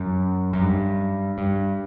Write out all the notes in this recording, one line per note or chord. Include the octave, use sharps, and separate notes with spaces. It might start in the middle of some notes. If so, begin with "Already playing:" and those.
Already playing: F#2
F#2
G2
G2